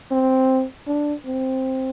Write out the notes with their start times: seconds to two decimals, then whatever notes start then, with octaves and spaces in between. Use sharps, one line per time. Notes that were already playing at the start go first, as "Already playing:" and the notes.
0.11 C4
0.87 D4
1.26 C4